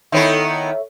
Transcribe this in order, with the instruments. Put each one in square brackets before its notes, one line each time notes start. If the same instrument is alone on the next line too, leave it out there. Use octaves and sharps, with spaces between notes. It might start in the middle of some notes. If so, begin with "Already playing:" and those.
[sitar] D#3 B3 E4 [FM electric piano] A4 C#5 E5